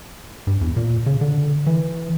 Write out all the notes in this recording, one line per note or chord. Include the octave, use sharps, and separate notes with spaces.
G2
E2
A#2
C#3
D3
E3